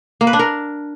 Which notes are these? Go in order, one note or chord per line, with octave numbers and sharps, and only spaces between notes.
A#3
B4
D4
A#4